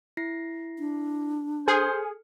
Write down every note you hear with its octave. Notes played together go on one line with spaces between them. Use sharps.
E4 A#6 C7
D4
G#4 A4 C5 F6 C#7